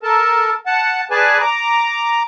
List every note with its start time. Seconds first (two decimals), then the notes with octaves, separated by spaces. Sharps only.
0.03 A4 A#4 A5
0.66 F#5 A5
1.11 G#4 B4 D5 G#5 A5
1.41 A#5 D6